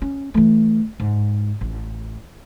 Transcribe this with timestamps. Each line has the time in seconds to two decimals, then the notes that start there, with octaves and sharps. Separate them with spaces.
0.02 C#4
0.34 E3 A3
1.00 G#2
1.61 A1